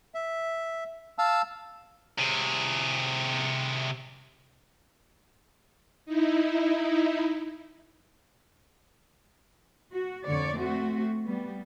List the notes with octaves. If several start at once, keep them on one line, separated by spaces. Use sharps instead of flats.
E5
F5 A5 E6
C3 G#4
D#4 E4
F#4
F2 D3 C#5 D5
A3 C4 F#4
G3 B3